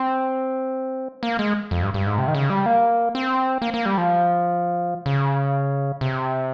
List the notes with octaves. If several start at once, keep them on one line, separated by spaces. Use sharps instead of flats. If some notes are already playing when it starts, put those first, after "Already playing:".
Already playing: C4
A#3
G#3
F2
G2
G2
G#2
C3
D#3
C#3
G3
A#3
C4
A#3
A#3
G3
F3
C#3
C3